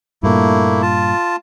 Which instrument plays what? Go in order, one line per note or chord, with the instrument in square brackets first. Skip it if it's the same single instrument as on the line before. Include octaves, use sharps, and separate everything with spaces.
[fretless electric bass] G2 A#2 [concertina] A3 A#3 E4
[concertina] F4 A5